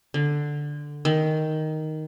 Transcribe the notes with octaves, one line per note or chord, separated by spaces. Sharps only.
D3
D#3